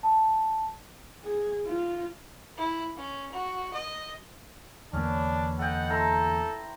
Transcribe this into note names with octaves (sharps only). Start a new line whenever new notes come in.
A5
G#4
F4
E4
C#4
F#4
D#5
E2 D3 A#3 B3 C#4 D4
A4 D#5 F#5 G5
E4 A4 A#5 C6